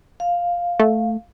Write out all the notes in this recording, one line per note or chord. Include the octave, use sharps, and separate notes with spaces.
F5
A3